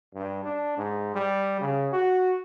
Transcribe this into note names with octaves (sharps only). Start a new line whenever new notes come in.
G2
D4
G#2
G3
C#3
F#4